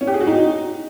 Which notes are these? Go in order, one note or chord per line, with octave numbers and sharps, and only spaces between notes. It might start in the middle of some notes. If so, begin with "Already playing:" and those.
C#4
G4
G#4
F#4
D#4